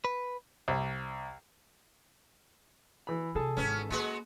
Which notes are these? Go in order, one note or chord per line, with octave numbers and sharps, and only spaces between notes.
B4
C2
E3 B5
C3 G#4 A4 A5
G#1 E3 B3 C#4
G#3 A#3 F#4 B4